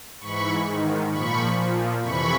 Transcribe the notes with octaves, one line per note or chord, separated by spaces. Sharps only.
G#2 E3 B5 C#6
G#2 D#3
A#2 F3 B5 C#6
A#2 F3
F2 C3 E3 B5 C#6